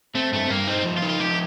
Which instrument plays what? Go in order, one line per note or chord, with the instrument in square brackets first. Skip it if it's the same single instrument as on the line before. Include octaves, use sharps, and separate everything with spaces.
[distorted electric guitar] A3 [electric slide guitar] C4
[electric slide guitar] G2 [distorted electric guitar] A3
[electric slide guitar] G2 [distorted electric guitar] A#3
[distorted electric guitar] C4 [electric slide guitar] D#4
[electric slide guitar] F3
[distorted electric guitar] F4
[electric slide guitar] D#4
[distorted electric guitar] F4
[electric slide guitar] F3 [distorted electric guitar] G4